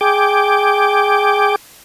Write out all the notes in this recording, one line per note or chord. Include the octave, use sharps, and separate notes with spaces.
G#4 G5 D6